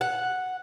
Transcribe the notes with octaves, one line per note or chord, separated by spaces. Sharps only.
F#5